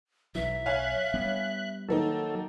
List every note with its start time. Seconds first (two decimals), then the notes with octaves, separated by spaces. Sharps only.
0.35 B1 E3 F#3 E5
0.66 C#5 F5 G#5 F#6
1.14 G3 B3 D4
1.89 D#3 F#3 A#3 D#4 A4